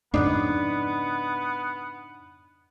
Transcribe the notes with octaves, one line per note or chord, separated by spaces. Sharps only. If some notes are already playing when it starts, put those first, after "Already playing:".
F2 G#2 C#3 B3 D4 D#4